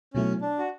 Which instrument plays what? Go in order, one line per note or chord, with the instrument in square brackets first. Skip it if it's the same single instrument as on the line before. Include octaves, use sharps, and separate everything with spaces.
[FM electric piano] B2 F#3 A3 E4 [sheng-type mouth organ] C#4
[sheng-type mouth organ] D4
F#4